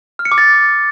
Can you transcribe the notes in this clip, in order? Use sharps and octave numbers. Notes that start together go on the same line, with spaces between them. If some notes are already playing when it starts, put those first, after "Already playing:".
F6
C#7
D6
A6